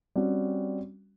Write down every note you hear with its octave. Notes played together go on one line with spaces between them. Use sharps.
G3 C4 C#4 F#4